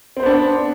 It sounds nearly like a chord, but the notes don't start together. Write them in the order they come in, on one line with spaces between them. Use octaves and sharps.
C4 C5 B3 D4